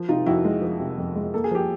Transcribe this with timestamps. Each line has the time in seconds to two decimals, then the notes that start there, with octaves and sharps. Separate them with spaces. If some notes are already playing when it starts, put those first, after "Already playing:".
Already playing: F3
0.09 C3 D#4 F4
0.26 F2 E4 F#4
0.45 G#3
0.62 F3
0.80 C3
0.98 F2
1.16 G#3
1.34 A#3 A4
1.44 G#4
1.51 F3 G4